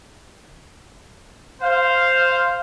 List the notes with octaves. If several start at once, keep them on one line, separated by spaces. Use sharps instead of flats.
C5 F5